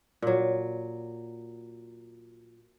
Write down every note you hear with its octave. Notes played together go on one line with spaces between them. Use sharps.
A#2 F#3